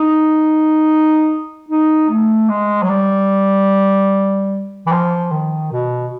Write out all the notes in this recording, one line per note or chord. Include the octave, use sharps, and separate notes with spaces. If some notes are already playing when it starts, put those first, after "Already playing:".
Already playing: D#4
D#4
A3
G#3
F#3
G3
E3
F3
D#3
B2